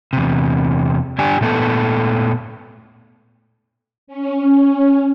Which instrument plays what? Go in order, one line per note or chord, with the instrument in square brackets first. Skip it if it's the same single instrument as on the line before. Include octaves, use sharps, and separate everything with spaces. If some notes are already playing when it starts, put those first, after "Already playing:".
[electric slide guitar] E2 C3
G2 D4 G4 G#5
A#2 A3 B3 A4
[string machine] C#4